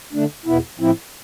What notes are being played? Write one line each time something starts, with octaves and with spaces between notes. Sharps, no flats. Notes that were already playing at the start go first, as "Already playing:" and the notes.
D3 A3 D4
E2 B2 B3 E4
A2 F3 C4 E4